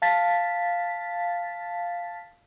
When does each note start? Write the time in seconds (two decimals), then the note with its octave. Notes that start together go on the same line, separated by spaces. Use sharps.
0.02 F5 A5 A6 B6